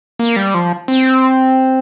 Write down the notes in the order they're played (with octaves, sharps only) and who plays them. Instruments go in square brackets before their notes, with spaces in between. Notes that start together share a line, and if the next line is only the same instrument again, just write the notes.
[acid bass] A#3
G3
F3
C4